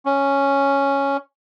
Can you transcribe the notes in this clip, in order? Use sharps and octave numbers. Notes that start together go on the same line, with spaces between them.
C#4